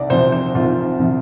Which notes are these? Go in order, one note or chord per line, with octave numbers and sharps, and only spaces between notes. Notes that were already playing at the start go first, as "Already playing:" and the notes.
Already playing: C2 D5
C3 F3 C5
C5
C2 F4
C3 F3